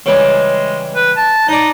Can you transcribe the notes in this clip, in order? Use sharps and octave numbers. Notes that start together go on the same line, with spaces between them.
C#3 E3 G3 G#3
B4
A5
D#4 D5 D#5